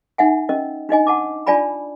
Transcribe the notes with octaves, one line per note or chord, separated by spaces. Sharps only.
D#4 E5 F#5 G#5
C#4 A#4 D#5
D4 D#4 D#5 G#5
F#5 A5 D6
D4 F4 D5 G#5 A5 B5